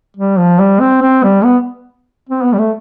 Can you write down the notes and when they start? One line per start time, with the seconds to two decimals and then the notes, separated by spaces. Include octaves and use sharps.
0.17 G3
0.38 F3
0.59 G3
0.80 C4
1.02 C4
1.23 G3
1.44 B3
2.29 C4
2.43 B3
2.53 G3
2.58 A3